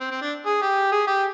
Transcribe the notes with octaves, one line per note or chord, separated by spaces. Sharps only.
C4
C4
D4
G#4
G4
G#4
G4